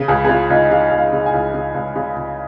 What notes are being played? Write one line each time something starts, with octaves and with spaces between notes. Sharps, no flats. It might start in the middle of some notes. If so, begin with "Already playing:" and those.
Already playing: C#3
C#2 G#4
G#4
C#3 F4
C#2 D#4
C#3 F5
C#2
F5
C#3
G#5
C#2
C#3
C#2
C#3
C#2